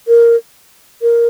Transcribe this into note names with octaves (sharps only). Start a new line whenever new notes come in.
A#4
A#4